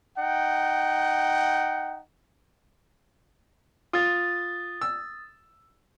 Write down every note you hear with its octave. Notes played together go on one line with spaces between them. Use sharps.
D#4 F#5 G5
F4 D#6 A6
E6